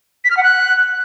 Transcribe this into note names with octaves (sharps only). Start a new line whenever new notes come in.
B6
F6
F#5
F#6